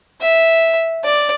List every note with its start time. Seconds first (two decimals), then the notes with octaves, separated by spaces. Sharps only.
0.22 E5
1.04 D5